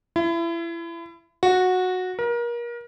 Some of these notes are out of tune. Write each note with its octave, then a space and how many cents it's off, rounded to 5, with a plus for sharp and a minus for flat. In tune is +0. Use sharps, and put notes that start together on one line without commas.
E4 +30
F#4 -10
A#4 +30